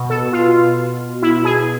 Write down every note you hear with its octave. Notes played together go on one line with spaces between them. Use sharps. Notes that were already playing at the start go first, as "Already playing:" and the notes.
Already playing: B2
A4
F4
E4
G#4